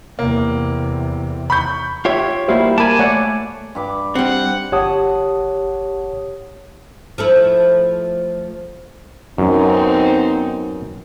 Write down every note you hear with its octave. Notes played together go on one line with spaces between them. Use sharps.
E2 C3 A#3
B5 C#6 G6
F4 G4 C#5 E5
G3 A#3 E4 F#4 C5 F5
A#3 A#4 G#5 A5 B5 D6
A3 C#5 D5 F#5
G2 B5 D6
G3 C4 F#5
G1 G4 C#5 F#5 A5 D#6
F3 A3 E4
F#2 B3 C4 D#4